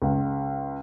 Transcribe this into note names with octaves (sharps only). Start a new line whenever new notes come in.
C#2